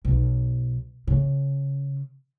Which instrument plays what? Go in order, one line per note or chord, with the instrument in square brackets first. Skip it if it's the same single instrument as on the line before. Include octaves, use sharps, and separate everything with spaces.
[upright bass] B1
C#3